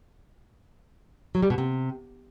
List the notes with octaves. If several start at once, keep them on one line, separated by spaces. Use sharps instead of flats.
F#3
G3
B2
C3